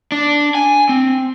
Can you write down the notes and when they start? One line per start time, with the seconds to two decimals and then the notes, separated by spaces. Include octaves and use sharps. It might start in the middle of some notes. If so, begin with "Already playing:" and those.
0.12 D4
0.55 G#5
0.89 C4